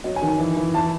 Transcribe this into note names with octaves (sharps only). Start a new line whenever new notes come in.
F#3 D#5
G#5
D#3
G#5
E3
E3
E3 A5